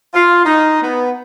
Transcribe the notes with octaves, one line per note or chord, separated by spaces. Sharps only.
F4
D#4
B3